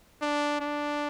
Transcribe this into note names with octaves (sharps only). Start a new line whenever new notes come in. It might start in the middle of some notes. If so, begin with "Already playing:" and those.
D4
D4